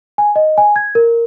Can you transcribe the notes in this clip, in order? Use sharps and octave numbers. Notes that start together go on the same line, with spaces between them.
G#5
D#5
G#5
G#6
A#4